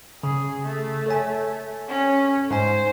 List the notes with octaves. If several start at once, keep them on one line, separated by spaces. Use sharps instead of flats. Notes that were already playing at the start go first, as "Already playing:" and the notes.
C#3 G#4
A3
A4 C#5 G#5
C#4
G#2 C5 G#5